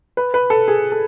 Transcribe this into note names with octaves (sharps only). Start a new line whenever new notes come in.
B4
B4
A4
G#4
A4